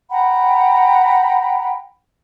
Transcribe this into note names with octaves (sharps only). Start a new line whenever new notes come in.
F#5 G5 A#5 B5